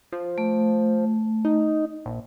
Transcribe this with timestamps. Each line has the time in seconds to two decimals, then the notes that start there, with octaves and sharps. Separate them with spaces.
0.13 F3
0.38 A3
1.45 D#4
2.06 A#1